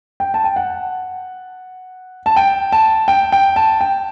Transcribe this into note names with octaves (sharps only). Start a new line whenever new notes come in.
G5
A5
G5
F#5
A5
G5
A5
G5
G5
A5
G5